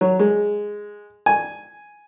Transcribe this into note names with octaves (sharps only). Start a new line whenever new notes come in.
F#3
G#3
G#5